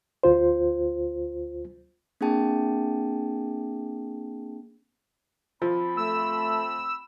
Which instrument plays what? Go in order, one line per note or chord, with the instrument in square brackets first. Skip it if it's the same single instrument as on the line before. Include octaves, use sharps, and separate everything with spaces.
[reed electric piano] D2 F4 C5
[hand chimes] A#3 C4 D4 G#4 G5 A5
[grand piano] F3 [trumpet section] C4 B5
[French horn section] A3 [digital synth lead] E6